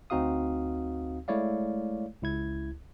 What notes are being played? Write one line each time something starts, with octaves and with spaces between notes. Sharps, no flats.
D2 C4 D#4 F#4 F5 D#6
G#3 A3 E4 C#5 D5 F5
C#2 E4 G#6